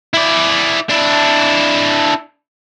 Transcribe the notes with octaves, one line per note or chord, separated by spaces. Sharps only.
E4 D5
D4 E4